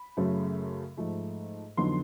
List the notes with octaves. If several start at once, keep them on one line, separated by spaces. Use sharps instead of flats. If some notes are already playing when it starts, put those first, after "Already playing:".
Already playing: B5
F#2 C#3 F#3 A3
G#2 F3 A3
F2 D3 F#3 B3 D#4 C6